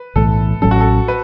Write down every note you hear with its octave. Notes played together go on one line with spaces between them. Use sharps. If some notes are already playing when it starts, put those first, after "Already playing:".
Already playing: B4
B1 A2 E3 A3 A4
A1 A2 F#3 C#4 A4
F#4
A4
B4